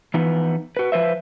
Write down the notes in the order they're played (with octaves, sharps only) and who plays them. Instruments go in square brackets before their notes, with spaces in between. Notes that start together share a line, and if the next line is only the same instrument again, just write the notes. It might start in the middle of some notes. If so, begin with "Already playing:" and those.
[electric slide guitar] E3 F3 B3 D#4
F#4 B4
F3 B4 C5 E5